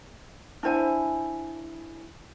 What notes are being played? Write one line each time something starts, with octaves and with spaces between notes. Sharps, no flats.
D4 E4 C5 G#5